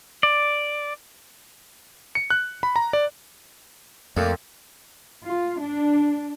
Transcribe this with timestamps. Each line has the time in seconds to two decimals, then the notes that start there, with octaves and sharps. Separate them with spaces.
0.23 D5
2.15 C#7
2.30 F#6
2.63 B5
2.76 A#5
2.93 D5
4.17 F2 A3 A#3 D4
5.26 F4
5.61 D4